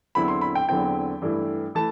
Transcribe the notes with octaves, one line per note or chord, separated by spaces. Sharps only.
E2 D3 F#3 C4 E4 B5
C6
B5
G5
E2 D3 F#3 C4 E4 G5
G2 E3 A3 E4
E3 A3 E4 A5